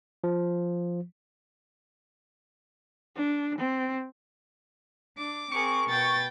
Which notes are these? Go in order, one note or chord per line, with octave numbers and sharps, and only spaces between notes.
F3
D4
C4
D4 D6
C4 G#4 A#4 C#6
B2 B3 G5 A6